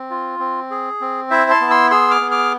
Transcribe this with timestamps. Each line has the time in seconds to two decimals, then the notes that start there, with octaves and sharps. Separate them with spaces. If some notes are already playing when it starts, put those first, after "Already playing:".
Already playing: C4
0.10 F4
0.39 C4
0.71 G#4
1.01 C4
1.31 E4 C5 E5
1.50 A5 C6
1.61 B3
1.70 C6 E6
1.90 G#4 C6 E6
2.11 D6 F6
2.21 B3
2.31 D6 F6